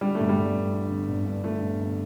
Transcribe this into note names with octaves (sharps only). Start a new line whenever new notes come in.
D3 G3
A3
G1
G3
G1
G2
D3
G1
G1
G2
D3 A3
G1
G1